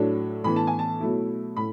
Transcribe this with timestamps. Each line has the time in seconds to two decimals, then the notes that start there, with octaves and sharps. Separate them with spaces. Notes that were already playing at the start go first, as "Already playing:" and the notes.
Already playing: A2 F#3 A3 D4
0.44 A2 E3 B3 B5
0.56 A5
0.67 G#5
0.79 A5
1.00 B2 F#3 A3 E4
1.57 A2 B5